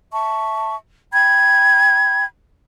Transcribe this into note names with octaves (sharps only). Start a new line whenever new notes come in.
E5 A5 C#6
G5 B5 G#6